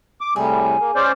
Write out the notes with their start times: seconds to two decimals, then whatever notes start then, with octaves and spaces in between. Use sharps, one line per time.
0.21 D6
0.36 A2 C3 G3 G#4
0.80 A#3
0.95 C#4 C5 D5